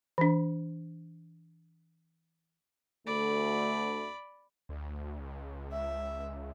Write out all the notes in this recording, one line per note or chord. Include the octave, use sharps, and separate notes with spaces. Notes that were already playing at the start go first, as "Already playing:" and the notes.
E3 D4
D2 A3 D5 B5
D2
C#2
E5